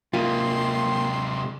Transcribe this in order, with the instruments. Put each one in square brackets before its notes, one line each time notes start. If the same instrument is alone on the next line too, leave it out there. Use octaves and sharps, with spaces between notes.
[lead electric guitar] C3 G#3 [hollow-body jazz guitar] A#3 F4 [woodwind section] G5 C6